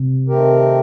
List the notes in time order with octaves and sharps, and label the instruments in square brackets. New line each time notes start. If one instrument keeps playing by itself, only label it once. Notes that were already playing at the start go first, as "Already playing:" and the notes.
Already playing: [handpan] C3
[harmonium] D#3 A3 C4 G4 A#4